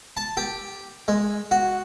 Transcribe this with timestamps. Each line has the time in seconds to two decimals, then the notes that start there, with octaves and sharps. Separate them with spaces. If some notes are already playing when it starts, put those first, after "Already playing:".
0.17 A5
0.37 G4
1.08 G#3
1.51 F#4